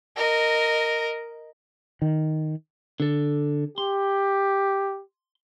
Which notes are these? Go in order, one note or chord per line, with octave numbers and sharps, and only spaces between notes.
A#4 D#5
D#3
D3 A4
G4 C6